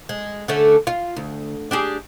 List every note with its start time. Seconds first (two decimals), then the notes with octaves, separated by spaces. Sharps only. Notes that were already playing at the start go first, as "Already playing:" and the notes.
0.09 G#3
0.48 D3 A3 C#4
0.87 F4
1.17 D2
1.71 D4 G4 G#4